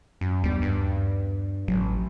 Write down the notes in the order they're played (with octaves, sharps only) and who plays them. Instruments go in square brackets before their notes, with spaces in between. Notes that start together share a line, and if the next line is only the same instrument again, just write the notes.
[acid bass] F#2
[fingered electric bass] D#2 B3 D4 [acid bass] G3
[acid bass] G2
[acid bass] A1 [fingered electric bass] F#3